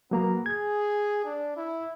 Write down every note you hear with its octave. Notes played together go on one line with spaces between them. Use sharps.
F#3 A#3 B3 A#5
G#4 G#6
D4
E4